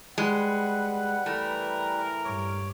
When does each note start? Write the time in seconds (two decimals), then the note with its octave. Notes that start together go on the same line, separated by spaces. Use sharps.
0.18 G3 G#3 B4 F#5
1.26 E3 A3 A#4
2.25 G2 C#5 D6